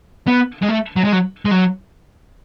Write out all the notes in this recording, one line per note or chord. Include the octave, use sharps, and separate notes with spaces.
B3
G#3
A3
F#3
G#3
F#3
G#3
F#3